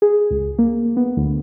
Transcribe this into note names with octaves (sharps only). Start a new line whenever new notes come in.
G#4
C#2
A#3
B3
D2